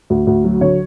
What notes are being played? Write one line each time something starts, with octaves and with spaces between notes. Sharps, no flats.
D2
D2
F#3
D3 C#5